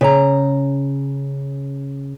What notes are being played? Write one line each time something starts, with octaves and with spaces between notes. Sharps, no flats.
C#3 D5 A#5